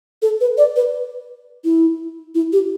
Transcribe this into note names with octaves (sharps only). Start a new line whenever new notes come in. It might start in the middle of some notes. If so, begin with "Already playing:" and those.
A4
B4
D5
B4
E4
E4
G4